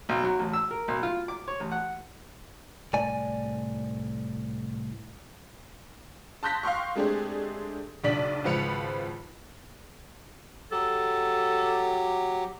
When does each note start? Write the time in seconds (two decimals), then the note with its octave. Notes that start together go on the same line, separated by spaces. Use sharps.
0.09 B1
0.24 F#2
0.39 A1
0.53 E6
0.71 A#4
0.88 B1
1.03 F4
1.28 D6
1.48 C#5
1.60 A1
1.72 F#5
2.93 C2 A2 D5 G#5
6.43 A5 C6 F#6 G6 A#6 B6
6.63 F5 G5 C6 C#6
6.96 G#3 A3 C4 D4 G4 G#4
8.04 F#1 B1 D4 D5 B6 F#7
8.44 G#1 C#2 F3 B4 C#7 F7
10.72 F#3 G4 A4